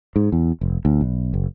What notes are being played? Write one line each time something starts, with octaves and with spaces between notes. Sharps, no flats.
G#2
E2
F1
D2
B1
F#1